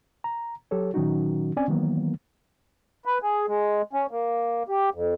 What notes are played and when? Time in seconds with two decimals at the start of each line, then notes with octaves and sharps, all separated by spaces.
0.24 A#5
0.71 F#3 G4 A4 C#5
0.94 A#2 D#3 F#3 C#4 D#4 F#4
1.57 C4 C#4 D5 G#5
1.68 D#3 E3 F#3 A#3 B3
3.05 B4
3.22 G#4
3.48 G#3
3.93 C#4
4.11 A#3
4.68 G4
4.94 F2